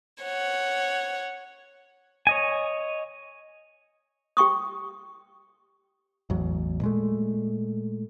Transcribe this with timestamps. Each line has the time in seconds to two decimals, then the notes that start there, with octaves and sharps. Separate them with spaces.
0.24 C#5 F#5
2.27 C#5 D#5 G#5
4.37 G4 G5 C#6 D#6
6.30 A1 E2 F#3
6.81 A#2 G#3 A3